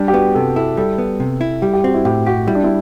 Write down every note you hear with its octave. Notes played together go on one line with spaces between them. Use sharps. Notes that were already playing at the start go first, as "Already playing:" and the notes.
Already playing: G3 D4
G4
B3 F#4
C3 A4
E4 A4
G3 A4
B3
C3
E4
G3 G4
G4
C4 F#4
E4
A2 G4
F#4 G4
G3 E4
D4
E4